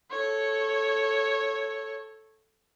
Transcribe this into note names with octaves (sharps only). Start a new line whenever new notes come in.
A4 C#5